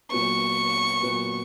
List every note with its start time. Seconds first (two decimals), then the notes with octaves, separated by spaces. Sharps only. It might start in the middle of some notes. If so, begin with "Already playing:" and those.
0.11 A#2 F#3 B3 C#6
1.02 A#2 F#3 B3